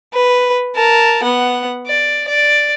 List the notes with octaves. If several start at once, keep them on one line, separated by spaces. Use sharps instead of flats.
B4
A#4 A5
B3 F#5
D5
D5